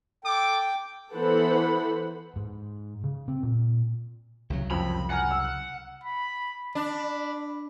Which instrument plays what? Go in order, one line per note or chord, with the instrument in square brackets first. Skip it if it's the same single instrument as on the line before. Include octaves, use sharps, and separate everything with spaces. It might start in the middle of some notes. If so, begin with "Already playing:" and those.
[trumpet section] A4 D6 [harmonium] G5
[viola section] E3 B3 A4 C5 F#5 B5
[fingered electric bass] G#2
C#3
C4
A#2
[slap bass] C2 C#3 F#3
[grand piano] F2 F3 C4 [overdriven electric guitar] B5
[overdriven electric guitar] F#5 [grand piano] G#5 A#5 F6
[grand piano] E6
[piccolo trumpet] B5
[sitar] D4 [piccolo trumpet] B5